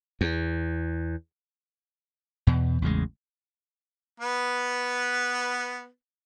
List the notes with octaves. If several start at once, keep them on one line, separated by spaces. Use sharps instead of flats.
E2
E2 B2
A1 E2 C#3 G#3
B3 B4